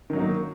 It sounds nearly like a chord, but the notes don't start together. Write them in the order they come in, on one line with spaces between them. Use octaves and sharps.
D#3 F#3 D#4 A#3